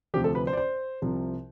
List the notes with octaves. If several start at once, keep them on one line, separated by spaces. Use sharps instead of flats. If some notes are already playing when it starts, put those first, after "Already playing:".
D2 C3 F3 G4
A4
B4
C5
D5
C5
C2 C3 F3